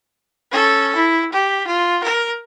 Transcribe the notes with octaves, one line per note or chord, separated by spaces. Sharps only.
C#4 A4
E4
G4
F4
A#4